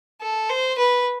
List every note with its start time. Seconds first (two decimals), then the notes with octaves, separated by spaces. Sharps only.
0.21 A4
0.50 C5
0.78 B4